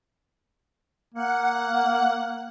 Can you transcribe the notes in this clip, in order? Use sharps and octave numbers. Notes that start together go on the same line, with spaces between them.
A#3 F#5